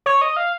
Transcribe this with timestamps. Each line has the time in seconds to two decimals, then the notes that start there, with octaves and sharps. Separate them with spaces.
0.06 C#5
0.22 D#5
0.37 F5